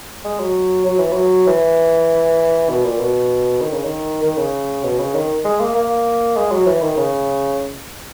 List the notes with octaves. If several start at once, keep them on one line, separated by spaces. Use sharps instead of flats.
G#3
F#3
F#3
E3
F#3
E3
B2
A#2
B2
D#3
C#3
D#3
D#3
C#3
B2
C#3
D#3
G#3
A#3
A#3
G#3
F#3
E3
D#3
C#3